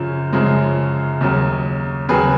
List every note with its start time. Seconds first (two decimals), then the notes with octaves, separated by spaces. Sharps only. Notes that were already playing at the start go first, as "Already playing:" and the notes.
Already playing: F#2 C#3 F3 F4
0.33 F#2 C#3 F3 G#3
1.21 D#2 C#3 F#3
2.09 D#2 C#3 F#3 G#4 B4